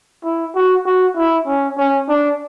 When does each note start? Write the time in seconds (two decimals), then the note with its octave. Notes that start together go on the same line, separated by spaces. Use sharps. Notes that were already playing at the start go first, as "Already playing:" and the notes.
0.24 E4
0.55 F#4
0.86 F#4
1.17 E4
1.47 C#4
1.78 C#4
2.09 D4